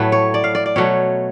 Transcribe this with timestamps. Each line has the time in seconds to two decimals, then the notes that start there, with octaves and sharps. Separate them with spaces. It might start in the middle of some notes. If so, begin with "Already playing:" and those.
Already playing: A2 F#3 A3 B4
0.12 C#5
0.34 D5
0.44 F5
0.55 D5
0.66 D5
0.76 B2 F#3 A3 C#5